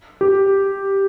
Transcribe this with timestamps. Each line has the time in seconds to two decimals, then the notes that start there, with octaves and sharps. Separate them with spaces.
0.21 G4